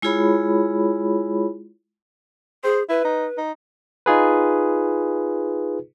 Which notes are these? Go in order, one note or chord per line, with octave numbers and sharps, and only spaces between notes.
G#3 E4 F4 G#4 C#5 B5
G#4 C5
E4 B4
D#4
D#4
D#4 F4 G#4 B4